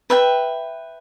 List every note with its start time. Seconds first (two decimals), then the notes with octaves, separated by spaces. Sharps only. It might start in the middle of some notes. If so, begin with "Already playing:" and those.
0.10 B4 E5 G5